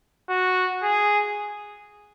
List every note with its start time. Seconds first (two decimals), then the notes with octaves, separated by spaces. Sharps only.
0.29 F#4
0.83 G#4